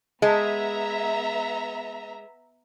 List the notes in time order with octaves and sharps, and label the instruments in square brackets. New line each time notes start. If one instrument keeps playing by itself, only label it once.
[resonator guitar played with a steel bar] G#3 [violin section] B3 E5 A#5